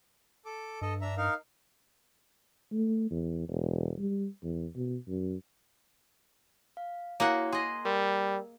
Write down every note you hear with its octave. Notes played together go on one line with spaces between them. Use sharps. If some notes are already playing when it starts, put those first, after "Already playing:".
A4 D6
G2 A4 D#5
D4 E5 A#5
D#4 A#4 F5
A3
E2
E1
G3
E2
B2
F#2
F5
A#3 E4 F#4 G#4 C#5 F#5
G#4 D#5 C6
G3 A#4